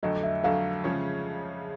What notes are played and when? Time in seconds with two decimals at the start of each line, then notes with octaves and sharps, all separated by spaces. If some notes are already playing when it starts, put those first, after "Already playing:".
0.03 F2 D3 F#3 A3 D#5
0.24 E5
0.43 F2 D3 F#3 A3 F5
0.84 C#3 F3 G#3 C#4